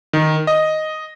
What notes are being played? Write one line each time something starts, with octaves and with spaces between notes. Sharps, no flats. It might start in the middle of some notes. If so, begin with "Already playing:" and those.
D#3
D#5